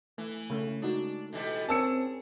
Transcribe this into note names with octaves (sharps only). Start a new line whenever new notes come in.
E3 A3
C#3 A3 C#4
G#3 D4 D#4 F#4
B2 E3 G3 A4
C4 C#4 G#4 A#4 A5 E6 C#7